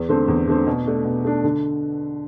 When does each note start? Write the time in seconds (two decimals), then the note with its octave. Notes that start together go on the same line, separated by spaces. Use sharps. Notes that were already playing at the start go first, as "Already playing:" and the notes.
Already playing: E2
0.09 D3 A3 C4
0.28 E2
0.47 D3 A3 C4
0.67 B2
0.86 A3 D4
1.05 B2
1.24 A3 D4
1.44 D3